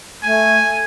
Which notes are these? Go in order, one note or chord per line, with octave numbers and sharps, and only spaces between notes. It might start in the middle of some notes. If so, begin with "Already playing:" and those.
A3 G#5